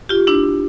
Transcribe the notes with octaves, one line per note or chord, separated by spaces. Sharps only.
F4 G4
D4 E4